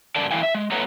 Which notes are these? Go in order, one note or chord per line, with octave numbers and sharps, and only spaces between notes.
G2 C#3 A#4 D5 A5
E3 A3 E4 F5 G5 G#5
E5
G#3
A3 B3 B4 C#5 F#5 A#5